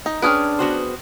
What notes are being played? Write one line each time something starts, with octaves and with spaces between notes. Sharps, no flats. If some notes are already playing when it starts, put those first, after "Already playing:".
D#4
C#4 D4 G#4 B4 G5 D#6 F6
B3 F#4 C5